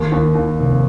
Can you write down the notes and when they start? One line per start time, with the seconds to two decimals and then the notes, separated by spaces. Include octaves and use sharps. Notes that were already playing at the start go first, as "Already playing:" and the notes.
Already playing: D#2
0.12 D#2
0.35 D#2
0.59 F1